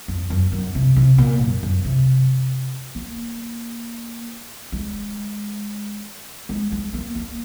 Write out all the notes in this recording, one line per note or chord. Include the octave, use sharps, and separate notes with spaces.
F2
F#2
F#2
C3
C3
A#2
F#2
F#2
C3
A#3
G#3
G#3
G#3
A#3
A#3